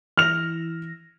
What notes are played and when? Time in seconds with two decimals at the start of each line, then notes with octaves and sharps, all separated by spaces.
0.17 E3 E4 F6 A#6 F7